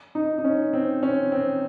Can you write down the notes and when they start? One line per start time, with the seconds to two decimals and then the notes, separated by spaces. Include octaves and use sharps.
0.15 D#4
0.38 D#4
0.44 C#4
0.73 C4
1.03 C#4
1.32 C4